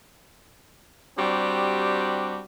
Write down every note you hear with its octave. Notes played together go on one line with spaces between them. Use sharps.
G3 C4 D4 F#4 G4